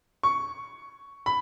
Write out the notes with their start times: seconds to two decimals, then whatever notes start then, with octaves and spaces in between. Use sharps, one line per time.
0.23 C#6
1.26 B5